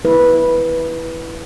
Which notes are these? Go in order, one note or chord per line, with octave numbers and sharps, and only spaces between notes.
E4 B4